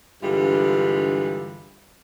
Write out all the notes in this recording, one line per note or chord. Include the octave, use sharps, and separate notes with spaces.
G2 D3 E3 G3 G#3 F4